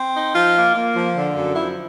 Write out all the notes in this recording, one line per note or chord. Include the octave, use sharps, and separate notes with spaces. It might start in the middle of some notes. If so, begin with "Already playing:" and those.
Already playing: C4
D#4
F3 F4
A#3
A#3
F3
D3
F#2
F3 E4